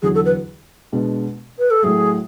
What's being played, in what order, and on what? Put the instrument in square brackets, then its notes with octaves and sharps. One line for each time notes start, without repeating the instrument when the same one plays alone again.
[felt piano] E2 D3 F#3 [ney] G#4
[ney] A4
B4
[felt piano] B2 G#3 B3 D4
[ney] B4
A4
[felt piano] A2 F#3 A3 [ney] G#4